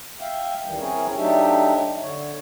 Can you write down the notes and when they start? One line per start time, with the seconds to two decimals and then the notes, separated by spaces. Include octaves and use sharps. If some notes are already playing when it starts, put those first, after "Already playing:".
0.21 E5 F5 G5
0.66 D#2 D#3 E3 G3 G5
0.79 C4 C#4 E4 G#4 A#4 C#5
1.16 F#3 A3 D4 D#4 G4 E5
2.02 D3 C#5